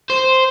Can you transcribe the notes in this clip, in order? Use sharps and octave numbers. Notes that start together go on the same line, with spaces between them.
C5